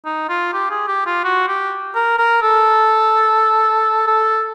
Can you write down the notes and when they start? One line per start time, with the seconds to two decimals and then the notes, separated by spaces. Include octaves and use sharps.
0.05 D#4
0.29 F4
0.53 G4
0.70 G#4
0.88 G4
1.06 F4
1.24 F#4
1.48 G4
1.95 A#4
2.18 A#4
2.42 A4
4.07 A4